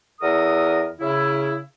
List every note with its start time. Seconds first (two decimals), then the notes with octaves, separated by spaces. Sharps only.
0.21 E2 A4 A#4 D#6
0.99 C#3 E4